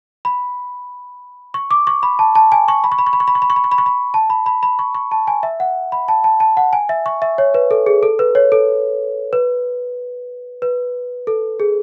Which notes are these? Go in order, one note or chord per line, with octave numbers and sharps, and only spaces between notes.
B5
C#6
D6
C#6
B5
A5
A5
G#5
C#6
B5
C#6
B5
C#6
B5
C#6
B5
C#6
B5
C#6
B5
C#6
B5
C#6
B5
A5
B5
B5
B5
C#6
C#6
A5
G#5
E5
F#5
B5
A5
A5
A5
F#5
G#5
E5
C#6
E5
C#5
B4
A4
G#4
A4
B4
C#5
A4
B4
B4
A4
G#4